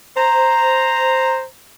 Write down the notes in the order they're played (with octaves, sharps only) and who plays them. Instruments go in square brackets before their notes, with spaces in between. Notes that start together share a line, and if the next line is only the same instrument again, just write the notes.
[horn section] C5 A#5